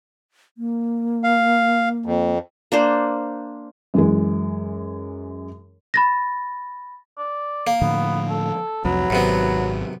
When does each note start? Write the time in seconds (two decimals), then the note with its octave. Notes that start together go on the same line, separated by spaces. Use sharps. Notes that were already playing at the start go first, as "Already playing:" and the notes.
0.58 A#3
1.24 F5
2.06 F2
2.72 A#3 D4 C5
3.94 F#2 E3 G#3
5.94 B5 A6 A#6
7.18 D5
7.67 A#3
7.82 A2 D3 F3 B3
8.29 A4
8.85 C2 F2 F#3 B4
9.10 G#1 F#2 C3 B3